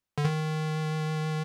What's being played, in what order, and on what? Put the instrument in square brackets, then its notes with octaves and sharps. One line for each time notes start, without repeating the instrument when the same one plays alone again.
[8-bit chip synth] D3
D#3